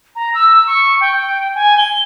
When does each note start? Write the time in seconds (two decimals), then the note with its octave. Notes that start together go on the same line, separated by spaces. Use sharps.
0.16 A#5
0.34 E6
0.67 C#6
1.01 G5
1.55 G#5
1.78 G7